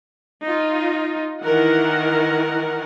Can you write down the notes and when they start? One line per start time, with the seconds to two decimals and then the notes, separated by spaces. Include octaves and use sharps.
0.44 D#4 F4
1.42 D#3 E3 A#4 F#5